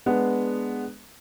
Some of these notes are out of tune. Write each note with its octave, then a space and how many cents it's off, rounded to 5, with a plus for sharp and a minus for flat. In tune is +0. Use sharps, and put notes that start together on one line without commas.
G#3 +0 B3 +0 D4 +0